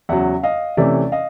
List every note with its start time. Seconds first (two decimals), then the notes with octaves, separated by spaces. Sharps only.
0.09 E2 C#3 F#3 E5 F#5
0.43 D#5 F5
0.77 C3 E3 A3 C#4 D5 E5
1.12 D#5 F5